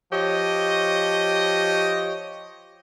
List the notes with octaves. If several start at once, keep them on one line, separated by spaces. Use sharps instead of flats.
F3 G4 C#5 D#5